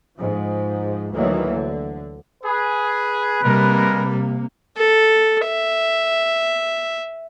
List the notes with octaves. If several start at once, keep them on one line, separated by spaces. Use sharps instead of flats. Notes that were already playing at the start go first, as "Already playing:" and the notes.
G#2 F3
D2 D#3 E3 F#3 A#3
D3
G#4 B4
C3 G3 G#3 A#3 A#4
A4
E5